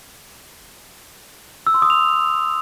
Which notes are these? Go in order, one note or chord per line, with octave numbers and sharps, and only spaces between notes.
E6
C6
D#6
F7